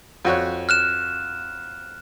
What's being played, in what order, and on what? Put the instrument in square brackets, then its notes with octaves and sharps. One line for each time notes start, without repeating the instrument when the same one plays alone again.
[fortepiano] F2 F#4 C#5
[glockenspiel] F6 F#6 E7